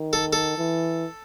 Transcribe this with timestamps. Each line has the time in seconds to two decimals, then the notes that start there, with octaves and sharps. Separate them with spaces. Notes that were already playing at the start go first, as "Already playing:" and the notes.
Already playing: D#3
0.13 A4
0.33 A4
0.58 E3